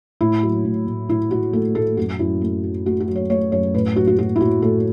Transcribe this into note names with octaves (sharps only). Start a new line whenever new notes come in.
A2 E4
F#3
A2
A2
A2 E4
A2 F#4
A3 A4
A2 A4
F#2 F#4
F#2 E4
A3
F#3
A3 F#4
F#4
F#3
C#5
A3 C#5
F#2 C#5
A2 B4
F#3 F#4
F#4
A2 F#4
E4
A2 F#4
A2 A4